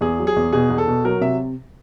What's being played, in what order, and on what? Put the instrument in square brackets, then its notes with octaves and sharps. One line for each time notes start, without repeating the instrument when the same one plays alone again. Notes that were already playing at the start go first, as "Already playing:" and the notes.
[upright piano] E2 [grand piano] G#4
[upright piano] F#3
[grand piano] G#4
[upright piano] E2
[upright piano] B2 [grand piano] G#4
[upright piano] E2
[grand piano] A4
[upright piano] B2
[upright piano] F#3 [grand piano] A#4
[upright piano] C3 [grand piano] E5